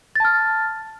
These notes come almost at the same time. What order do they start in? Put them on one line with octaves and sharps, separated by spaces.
A6 A5 F6